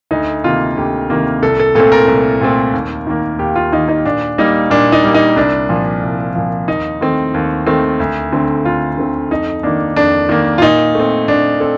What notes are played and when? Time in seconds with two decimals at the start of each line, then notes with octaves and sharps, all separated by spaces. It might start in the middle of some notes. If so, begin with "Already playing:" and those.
0.11 D2 D#4
0.44 C3 D#3 A#3 F4
0.77 D2 G4
1.10 C3 D#3 A#3
1.42 C2 A4
1.59 A4
1.75 A#2 A3 C4 A4
1.92 A#4
2.08 C2
2.41 A#2 A3 C4
2.73 D#2
3.07 D#3 A#3
3.39 D#2 G4
3.55 F4
3.73 D#3 A#3 D#4
3.88 D#4
4.05 A#2 D4
4.38 G3 A#3 D#4
4.70 A#2 D4
4.92 D#4
5.04 G3 A#3
5.14 D#4
5.36 C2 D4
5.69 A#2 F3
6.03 C2
6.35 A#2 F3
6.68 D#2 D#4
7.01 D#3 A3 C4
7.34 D#2
7.66 D#3 A3 C4
8.00 D2
8.32 D3 A3 C4
8.65 D2 F4
8.97 D3 A3 C4
9.31 F2 D#4
9.63 D#3 A#3 D4
9.96 F2 D4
10.29 D#3 A#3
10.58 F4
10.62 A#2 D#4
10.95 A3 C4
11.28 A#2 D4
11.60 C4 A4